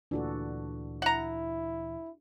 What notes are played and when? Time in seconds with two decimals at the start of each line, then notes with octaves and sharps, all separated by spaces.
0.11 D2 A#2 E3 D4 F#4 A4
1.02 E4 F#5 A#5